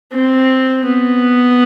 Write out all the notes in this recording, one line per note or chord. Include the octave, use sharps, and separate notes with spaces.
C4
B3